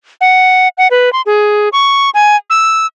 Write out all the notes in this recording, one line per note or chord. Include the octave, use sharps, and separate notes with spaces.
F#5
F#5
B4
C6
G#4
C#6
G#5
E6